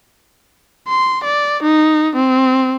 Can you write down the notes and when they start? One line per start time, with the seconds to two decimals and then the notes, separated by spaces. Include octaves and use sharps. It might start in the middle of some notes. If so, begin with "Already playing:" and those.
0.88 C6
1.24 D5
1.63 D#4
2.16 C4